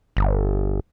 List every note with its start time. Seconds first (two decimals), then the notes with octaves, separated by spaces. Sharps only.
0.17 G1